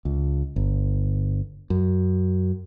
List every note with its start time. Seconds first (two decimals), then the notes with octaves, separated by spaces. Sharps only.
0.05 C#2
0.56 G1
1.70 F#2